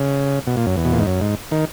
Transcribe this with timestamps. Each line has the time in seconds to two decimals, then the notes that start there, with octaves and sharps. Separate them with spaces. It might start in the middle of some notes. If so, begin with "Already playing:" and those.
Already playing: C#3
0.47 B2
0.57 A#2
0.67 F#2
0.77 E2
0.85 B2
0.92 A#2
0.99 G#2
1.07 F#2
1.21 G#2
1.51 D#3